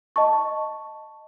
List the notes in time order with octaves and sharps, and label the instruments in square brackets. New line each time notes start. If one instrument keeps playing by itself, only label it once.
[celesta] D#5 A5 C#6